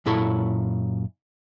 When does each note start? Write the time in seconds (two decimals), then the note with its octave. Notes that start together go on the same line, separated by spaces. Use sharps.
0.06 F#2 A#2 E4 A4 C#5